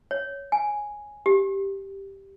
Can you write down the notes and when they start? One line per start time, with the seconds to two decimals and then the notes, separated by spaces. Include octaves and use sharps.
0.11 C#5
0.52 G#5
1.26 G4